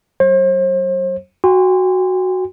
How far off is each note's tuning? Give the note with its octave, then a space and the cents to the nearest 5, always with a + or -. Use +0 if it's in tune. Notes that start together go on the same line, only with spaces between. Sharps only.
F#3 +35 C5 +40
F#4 +0 G5 +45 C6 -15